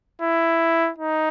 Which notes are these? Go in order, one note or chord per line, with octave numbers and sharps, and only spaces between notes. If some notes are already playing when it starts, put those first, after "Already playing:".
E4
D#4